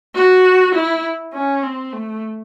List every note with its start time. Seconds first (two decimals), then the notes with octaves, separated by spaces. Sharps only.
0.15 F#4
0.75 E4
1.34 C#4
1.63 C4
1.93 A3